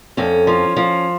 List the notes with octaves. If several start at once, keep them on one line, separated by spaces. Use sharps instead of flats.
F2 C#4
F3
F3